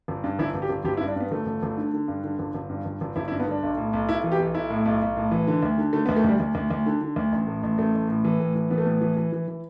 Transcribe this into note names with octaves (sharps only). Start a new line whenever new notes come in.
G1
G2
G1 E4
G1
G4
G1
G1 G4
E4
G2
D4
G2 B3
G1 A3
G1
G1
D3
D3
G2
D3
G1
G1
G2
G1
G1
G1 E4
E4
G2
B3
D3 D4
B1
A2
B1
B1 E4
E3
G4
B1
B1 E4
A2
B1
B1
A2
E3
D3
D2
D3
D3 A3
B3
D2
A3
D2 G3
D2
D2
D2
D3
D3
D2
A1
A2
A1
A1 A3
A1
A2
E3
A2
E3
E3 B3
A3
A2 B3
E3
E3
E3
E3